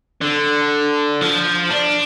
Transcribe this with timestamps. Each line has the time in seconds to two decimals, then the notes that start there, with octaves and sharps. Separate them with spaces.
0.22 D3
1.21 F3
1.70 D4